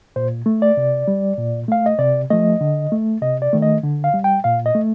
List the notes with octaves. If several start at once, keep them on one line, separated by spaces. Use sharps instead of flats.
A#2 C5
A3
D5
C3
G3
A#2
A3 F5
D#5
C3 D5
F3 A3 D#5
D3
A3
C3 D#5
D5
D#3 A3
D#5
D3
F5
G3
G5
A#2 F5
D#5
A3